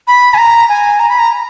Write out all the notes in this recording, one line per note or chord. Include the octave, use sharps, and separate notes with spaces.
B5
G#5
A#5
G#5
A#5
B5
A#5